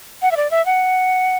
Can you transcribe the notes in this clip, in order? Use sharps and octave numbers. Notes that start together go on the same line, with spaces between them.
F#5
E5
D5
E5
F#5